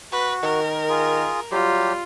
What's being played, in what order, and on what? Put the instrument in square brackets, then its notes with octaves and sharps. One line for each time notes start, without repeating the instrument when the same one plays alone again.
[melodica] F#4 [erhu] B4
[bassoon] D#3 [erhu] A#4
[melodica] F4 G#4
[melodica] F#3 G4 [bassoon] G3 [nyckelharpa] F4